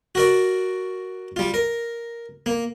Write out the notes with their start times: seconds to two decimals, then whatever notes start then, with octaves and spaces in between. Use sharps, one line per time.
0.15 F#4 A#4 D5
1.36 G3 F4
1.54 A#4
2.46 A#3